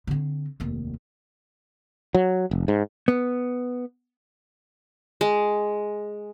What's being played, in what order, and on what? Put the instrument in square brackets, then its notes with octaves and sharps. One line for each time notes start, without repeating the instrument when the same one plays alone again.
[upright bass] D3 C4
F1 D#2
[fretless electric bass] F#3
F1
G#2
[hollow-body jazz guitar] B3
[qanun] G#3